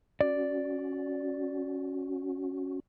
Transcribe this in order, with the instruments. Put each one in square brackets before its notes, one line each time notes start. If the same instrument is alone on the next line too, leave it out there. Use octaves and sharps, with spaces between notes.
[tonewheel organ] C#4 F#4 [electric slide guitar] D5